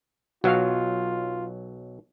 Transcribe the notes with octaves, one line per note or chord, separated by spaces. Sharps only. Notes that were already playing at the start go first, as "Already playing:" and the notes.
B1 F#3 F4 F#4 F5